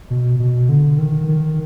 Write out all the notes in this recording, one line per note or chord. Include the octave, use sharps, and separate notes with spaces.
B2
B2
D3
D#3
D#3